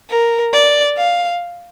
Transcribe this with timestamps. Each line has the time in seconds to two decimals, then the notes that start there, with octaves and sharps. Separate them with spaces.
0.10 A#4
0.53 D5
0.98 F5